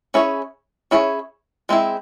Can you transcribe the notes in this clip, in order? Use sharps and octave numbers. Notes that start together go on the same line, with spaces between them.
C#4 E4 G#4 C#5
C#4 E4 G#4 C#5
G#3 C4 E4